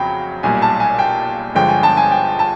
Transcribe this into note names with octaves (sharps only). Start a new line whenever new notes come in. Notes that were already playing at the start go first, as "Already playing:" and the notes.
Already playing: F2 C#3 F#3 G5 B5
B1 A#2 G3 G#5
A5
G#5
G5
G1 G2 D3 F3 G#3 G5
G#5
A5
G#5
G5
A5